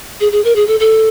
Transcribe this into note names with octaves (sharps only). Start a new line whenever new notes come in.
G#4
G#4
A#4
G#4
A4
A4